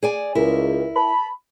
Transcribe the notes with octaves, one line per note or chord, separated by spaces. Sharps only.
G#4 D5 G#5
C#2 E4 A#4
A5 B5